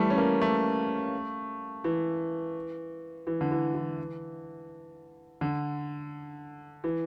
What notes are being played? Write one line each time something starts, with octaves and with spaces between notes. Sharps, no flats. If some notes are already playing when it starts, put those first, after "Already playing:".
Already playing: E3 G3 A3
C#4
A#3
A3
E3
E3
D3
E3
E3
D3
E3